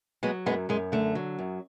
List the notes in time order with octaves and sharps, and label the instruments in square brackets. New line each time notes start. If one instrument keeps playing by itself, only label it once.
[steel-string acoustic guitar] F#3 G#3 B3
F#2 G#3 B3
F#2 G#3
D3 A3
F#3
F#2